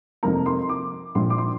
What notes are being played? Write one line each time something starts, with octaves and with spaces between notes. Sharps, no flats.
F1 F2 F3 A#3 A#5
C6
D6
A#1 A#2 F3 C6
D6
C6